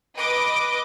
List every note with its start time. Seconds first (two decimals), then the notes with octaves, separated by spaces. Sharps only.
0.17 B4 D#5 D6